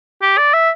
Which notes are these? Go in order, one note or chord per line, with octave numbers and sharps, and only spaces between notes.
G4
D5
E5